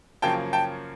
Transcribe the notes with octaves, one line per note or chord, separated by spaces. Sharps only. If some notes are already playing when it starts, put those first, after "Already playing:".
F#2 C#3 F3 A#3 C#4 G5 A5
G5 A5